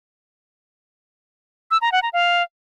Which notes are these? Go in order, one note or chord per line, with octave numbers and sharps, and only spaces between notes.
E6
A#5
F#5
A#5
F5